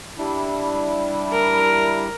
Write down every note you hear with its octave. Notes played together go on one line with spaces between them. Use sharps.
G3 D4 E4
A#4